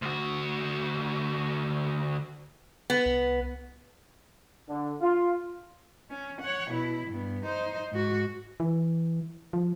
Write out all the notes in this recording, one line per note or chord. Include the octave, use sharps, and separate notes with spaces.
D2 F#4
B3
C2
D3
F4
C#4
C#5 F#5
B2 E4
G2 B3
D#4 C5
G#2 F#4
E3
F3